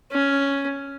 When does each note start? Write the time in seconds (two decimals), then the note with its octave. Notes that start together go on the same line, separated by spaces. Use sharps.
0.12 C#4